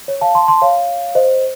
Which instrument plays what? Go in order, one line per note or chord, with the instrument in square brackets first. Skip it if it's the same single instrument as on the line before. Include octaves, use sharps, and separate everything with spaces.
[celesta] C#5
F5 A5
A5 C6
A5 C6
C#5 F5
C5 D#5